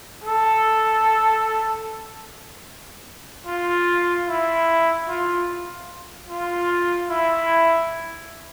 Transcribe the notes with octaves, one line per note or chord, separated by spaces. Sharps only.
A4
F4
E4
F4
F4
E4